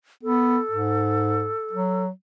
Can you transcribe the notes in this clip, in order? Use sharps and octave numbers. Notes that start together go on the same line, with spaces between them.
B3 A4
G#2
F#3